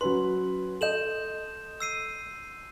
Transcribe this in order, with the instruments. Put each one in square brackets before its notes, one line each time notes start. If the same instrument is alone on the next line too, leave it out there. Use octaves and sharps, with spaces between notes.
[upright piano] F#3 C#4 B4 [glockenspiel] C6
[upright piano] A4 D#5 [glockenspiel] G6 E7 F#7
[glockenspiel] E6 C7 D#7